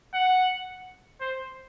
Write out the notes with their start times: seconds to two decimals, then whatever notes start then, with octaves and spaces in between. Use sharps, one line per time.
0.14 F#5
1.21 C5